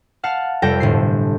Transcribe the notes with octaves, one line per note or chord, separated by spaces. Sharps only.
F5 F#5 A5 F6
F1 F2 G3 A4 G5 A#6
G1 A2 C7